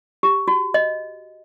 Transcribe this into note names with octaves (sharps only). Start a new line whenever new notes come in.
G4
F#4
D#5